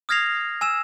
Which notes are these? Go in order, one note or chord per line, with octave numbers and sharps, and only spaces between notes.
D#6 F6 G#6 A#6 C7 F7
G#5 E6 E7